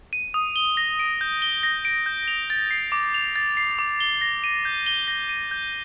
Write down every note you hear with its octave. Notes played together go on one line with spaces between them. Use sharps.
D#7
D#6
G7
A#6
D7
G6
G7
A#6
D7
G6
F7
A6
C7
D6
F7
A6
C7
D6
G7
A#6
D#7
G6
G7
A#6
D#7
G6